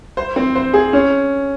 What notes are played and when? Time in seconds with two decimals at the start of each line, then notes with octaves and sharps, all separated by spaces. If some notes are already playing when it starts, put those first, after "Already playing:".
0.17 C5
0.36 C4
0.55 C5
0.73 G#4
0.93 C#4